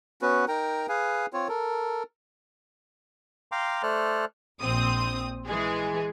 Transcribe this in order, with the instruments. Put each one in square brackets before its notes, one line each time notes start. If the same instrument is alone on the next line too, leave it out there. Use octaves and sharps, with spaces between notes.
[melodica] B3 C#4 F#4 B4
D#4 A#4 G5 A#5
G#4 B4 F5 G#5
C4 F4 C#5
A4 A#4
[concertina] F5 G5 A#5 C6 D6
A3 A4 C5 D5 F6 F#6
[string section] A#1 C4 D#6
E3 G#3 G#4